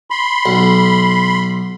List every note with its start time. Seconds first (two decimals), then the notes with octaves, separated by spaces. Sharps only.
0.10 B5 C6
0.46 B1